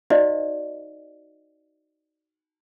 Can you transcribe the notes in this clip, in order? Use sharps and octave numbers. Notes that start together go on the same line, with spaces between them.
D#4 F#4 C5 D5 D#5 F5